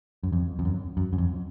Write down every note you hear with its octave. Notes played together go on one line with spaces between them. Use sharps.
F#2
F2
F2
F#2
F#2
F#2
F2